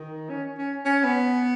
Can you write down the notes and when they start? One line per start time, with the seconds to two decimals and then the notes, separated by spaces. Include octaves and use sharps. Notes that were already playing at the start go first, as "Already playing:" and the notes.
Already playing: D#3
0.30 C#4
0.58 C#4
0.85 C#4
1.04 B3